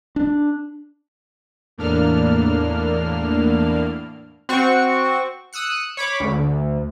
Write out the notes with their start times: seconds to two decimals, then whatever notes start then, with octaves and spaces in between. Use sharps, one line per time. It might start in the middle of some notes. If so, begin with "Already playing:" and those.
0.16 D4
1.78 E2 A2 A#3 D4 F6
4.49 C4 F#4 C#6
5.53 D#6 E6 F#6 C#7
5.97 C#5 B5 D6
6.20 D2